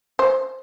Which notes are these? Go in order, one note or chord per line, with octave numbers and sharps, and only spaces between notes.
C5